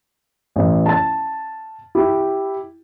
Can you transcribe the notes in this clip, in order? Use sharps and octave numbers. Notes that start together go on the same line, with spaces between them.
A1
A5 A6
E4 G4